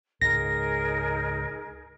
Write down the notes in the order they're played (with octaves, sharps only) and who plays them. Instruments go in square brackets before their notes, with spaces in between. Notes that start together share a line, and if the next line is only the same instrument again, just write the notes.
[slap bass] C#2 G#2 [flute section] D#4 G#4 A#4 [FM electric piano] A#6